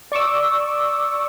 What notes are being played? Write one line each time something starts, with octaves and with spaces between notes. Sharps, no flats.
D5 C#6 D6 E6